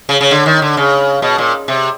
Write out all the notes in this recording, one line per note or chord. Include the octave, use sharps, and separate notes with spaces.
C#3
C#3
D3
D#3
D3
C#3
B2
A#2
C3